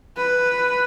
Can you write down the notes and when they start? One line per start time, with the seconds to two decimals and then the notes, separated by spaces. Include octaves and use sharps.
0.16 B4